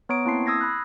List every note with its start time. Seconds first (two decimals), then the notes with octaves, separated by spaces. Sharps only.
0.09 B3 C#5 A#5 C#6 D#6 D7
0.25 A#3 C4 E4 A5 C6 C7
0.46 D#6 E6 G#6 A#6 C7
0.61 B5 F#6